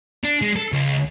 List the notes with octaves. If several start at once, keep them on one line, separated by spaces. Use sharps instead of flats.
D4
G#3
A4
C#2